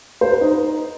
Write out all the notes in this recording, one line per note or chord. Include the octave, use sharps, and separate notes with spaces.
C5
B4
D#4